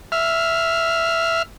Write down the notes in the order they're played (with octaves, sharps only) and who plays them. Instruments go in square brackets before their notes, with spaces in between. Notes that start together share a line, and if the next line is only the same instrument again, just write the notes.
[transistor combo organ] E5 F6